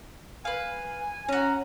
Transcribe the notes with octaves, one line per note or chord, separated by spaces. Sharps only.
B4 F5 G#5
C#4 F#4 A#5